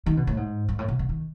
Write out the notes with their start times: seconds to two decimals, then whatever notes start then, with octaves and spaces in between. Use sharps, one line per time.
0.06 D#3
0.17 B2
0.27 A2
0.37 G#2
0.69 G#2
0.79 A2
0.88 B2
0.99 B2
1.09 D#3